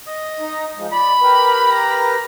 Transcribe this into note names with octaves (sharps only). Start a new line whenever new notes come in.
D#5
D#4
F3 G#3
D5 B5
G4 A#4 B4
A#5